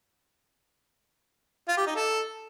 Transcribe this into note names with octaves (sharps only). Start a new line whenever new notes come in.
F4
G4
D#4
A4